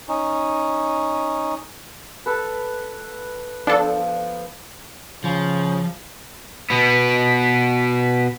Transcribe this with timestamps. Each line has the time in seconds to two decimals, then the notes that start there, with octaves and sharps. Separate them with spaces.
0.08 C#4 D#4
2.26 A4 B4
3.67 F3 B3 D4 A4 E6
5.24 C#3 F3
6.70 B2 B3